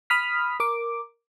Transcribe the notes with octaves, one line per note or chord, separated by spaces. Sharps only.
B5 D#6 F6 B6
A#4 D6